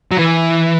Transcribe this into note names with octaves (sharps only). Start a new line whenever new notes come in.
F#3
E3